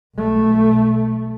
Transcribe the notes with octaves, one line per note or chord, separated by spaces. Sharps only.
B1 A3